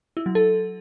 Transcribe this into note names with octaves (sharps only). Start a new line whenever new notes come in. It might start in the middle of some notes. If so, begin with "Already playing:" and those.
E4
F#3
A4